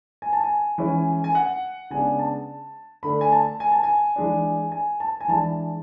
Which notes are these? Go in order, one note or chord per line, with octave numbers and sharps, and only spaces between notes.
G#5
A5
G#5
E3 G#3 C#4
G#5
F#5
C#3 G#3 B3 D4 G#5
A5
D3 A3 D4 B5
G#5
A5
G#5
A5
G#5
E3 G#3 D4
G#5
A5
G#5
E3 G#3 D4 A5